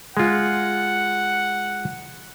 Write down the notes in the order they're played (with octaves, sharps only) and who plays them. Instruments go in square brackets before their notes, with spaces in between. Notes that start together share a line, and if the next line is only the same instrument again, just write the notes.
[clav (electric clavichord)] G#3 F4 [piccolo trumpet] F#5